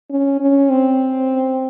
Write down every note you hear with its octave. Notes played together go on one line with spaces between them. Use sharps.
C#4
C#4
C4